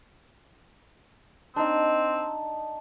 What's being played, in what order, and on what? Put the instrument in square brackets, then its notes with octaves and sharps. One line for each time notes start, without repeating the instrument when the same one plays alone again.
[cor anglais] C4 [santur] D4 D#4